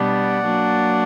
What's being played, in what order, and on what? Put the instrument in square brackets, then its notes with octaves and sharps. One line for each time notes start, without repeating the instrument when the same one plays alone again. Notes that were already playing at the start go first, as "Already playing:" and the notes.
Already playing: [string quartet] B2 G3 B3 D4 [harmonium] D5 F#5
[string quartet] F#3 A#3 D4